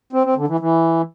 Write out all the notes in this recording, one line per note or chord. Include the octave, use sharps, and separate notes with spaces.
C4
C4
D3
E3
E3